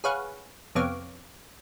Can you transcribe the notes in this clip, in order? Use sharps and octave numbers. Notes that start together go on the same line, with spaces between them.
G#4 B4 C#5 F5 F#5
F2 C3 B3 C#5 F5 D6